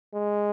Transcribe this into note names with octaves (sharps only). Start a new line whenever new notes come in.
G#3